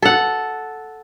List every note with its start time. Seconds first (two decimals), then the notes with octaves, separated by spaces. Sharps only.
0.02 A4 F#5